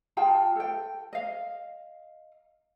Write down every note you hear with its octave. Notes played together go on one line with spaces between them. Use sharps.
F4 G#4 G5 A5
A4 G5
D#5 F5